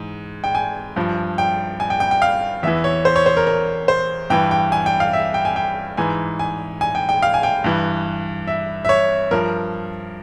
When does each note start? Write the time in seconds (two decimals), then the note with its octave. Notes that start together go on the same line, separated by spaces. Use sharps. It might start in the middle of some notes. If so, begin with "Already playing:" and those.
Already playing: G#2 E3
0.44 G5
0.55 G#5
0.96 G2 F3
1.38 G5
1.80 G#5
1.90 G5
2.00 G5
2.11 G5
2.22 F5
2.63 E2 E3 E5
2.84 C#5
3.05 C5
3.16 C#5
3.26 C5
3.37 A#4
3.47 A#4
3.88 C5
4.30 G2 E3 G5
4.51 G5
4.72 G#5
4.86 G5
5.00 F5
5.13 E5
5.34 G5
5.45 G#5
5.56 G5
5.97 G#2 E3 G#5
6.39 G#5
6.81 G#5
6.95 G5
7.09 G5
7.22 F5
7.34 G#5
7.43 G5
7.64 G2 E3
8.47 E5
8.85 E5
8.89 C#5
9.31 G2 F3 A#4